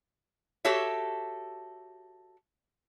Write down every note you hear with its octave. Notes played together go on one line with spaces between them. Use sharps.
F#4 G4 A4 C#5 E5